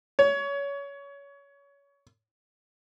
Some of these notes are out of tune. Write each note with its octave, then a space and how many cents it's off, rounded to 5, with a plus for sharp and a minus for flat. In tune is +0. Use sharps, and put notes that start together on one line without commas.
C#5 +25